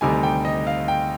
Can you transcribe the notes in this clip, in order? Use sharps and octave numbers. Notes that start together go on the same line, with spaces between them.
D2 C3 D#3 G3 G#5
G5
D#5
F5
G5